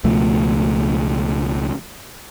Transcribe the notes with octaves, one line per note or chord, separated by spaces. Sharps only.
C#2 B2 F3 A3